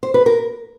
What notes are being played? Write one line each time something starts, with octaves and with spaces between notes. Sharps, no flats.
C5
B4
A#4